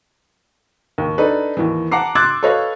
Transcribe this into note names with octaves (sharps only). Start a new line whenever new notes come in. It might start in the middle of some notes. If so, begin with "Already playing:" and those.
D#2
D4 D#4 A4 B4
D#2 E3
F#5 A5 A#5 D6 C7
C6 D6 E6 F#6 G#6 A6
A4 B4 C#5 D#5 F5